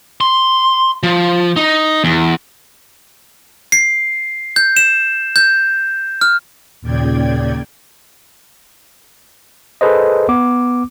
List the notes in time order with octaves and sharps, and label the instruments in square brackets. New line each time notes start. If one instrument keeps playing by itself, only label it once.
[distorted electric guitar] C6
F3
D#4
E2
[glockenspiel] C7
G6
E7
G6
F6
[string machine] D#2 A#2 C#3 D5 G5 G#6
[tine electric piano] G#4 A4 B4 C5 D#5
B3 D6